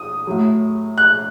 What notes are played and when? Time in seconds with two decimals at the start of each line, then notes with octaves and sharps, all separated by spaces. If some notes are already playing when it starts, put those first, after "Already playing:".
Already playing: D#6
0.27 A2 F#3
0.98 F#6